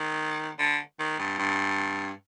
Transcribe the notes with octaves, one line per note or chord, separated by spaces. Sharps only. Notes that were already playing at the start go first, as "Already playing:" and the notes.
Already playing: D#3
D3
D#3
G2
G2